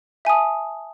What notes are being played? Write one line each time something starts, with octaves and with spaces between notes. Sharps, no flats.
E5 G#5 A5 D#6